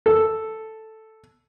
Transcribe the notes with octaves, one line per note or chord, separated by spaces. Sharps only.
A4